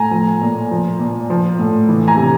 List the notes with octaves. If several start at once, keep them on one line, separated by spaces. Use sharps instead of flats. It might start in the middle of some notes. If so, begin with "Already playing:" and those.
Already playing: A2 G#5 A#5
F3
A#2
F3
A#2
F3
A2
E3
G#5 A#5
C3